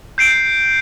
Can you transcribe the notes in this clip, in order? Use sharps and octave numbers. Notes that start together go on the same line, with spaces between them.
G6 C7 D7